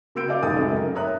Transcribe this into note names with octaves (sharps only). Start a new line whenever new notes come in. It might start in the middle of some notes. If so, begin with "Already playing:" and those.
C#3 A#3 F#4 E6 G6 D7
D5 D#5 F5 D6 G6
D#1 D#2 A3 G5 D#6 A6
C2 F#2 C#3 G#3 A3
A#4
C#5 E5 A#5 D#6 F#6